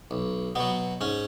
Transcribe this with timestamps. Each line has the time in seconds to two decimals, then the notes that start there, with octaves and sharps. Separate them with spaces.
0.11 B1
0.55 B2 F#3 B3
1.01 G#2 C#4